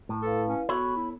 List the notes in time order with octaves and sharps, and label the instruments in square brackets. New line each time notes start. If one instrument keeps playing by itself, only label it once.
[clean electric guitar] A2
[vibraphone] E4 B4 F5 [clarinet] A4
[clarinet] C#4
[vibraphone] B3 [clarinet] F#4 [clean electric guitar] A4 C#5 B5
[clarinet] E4